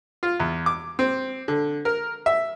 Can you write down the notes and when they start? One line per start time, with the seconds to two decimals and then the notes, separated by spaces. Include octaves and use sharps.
0.23 F4
0.40 E2
0.66 D6
0.99 C4
1.48 D3
1.85 A#4
2.26 E5